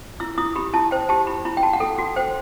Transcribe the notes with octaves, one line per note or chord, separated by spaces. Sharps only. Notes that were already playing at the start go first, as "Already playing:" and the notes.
E4 E6
E4 D#6
G4 B5
E4 A5
C5 G5
G4 A5
E4 B5
E4 B5
G5
F#4 A5
F#5
A4 G5
F#4 F#5
C5 G5